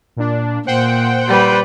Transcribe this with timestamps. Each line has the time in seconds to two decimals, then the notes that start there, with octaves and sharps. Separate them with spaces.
0.16 A#2 D4
0.66 A#2 C5 F#5 G5
1.28 G3 B4